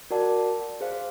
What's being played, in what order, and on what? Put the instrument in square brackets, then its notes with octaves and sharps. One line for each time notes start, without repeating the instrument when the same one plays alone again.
[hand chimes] F#4 A#4 D5 F#5 A5
G#4 C5 F5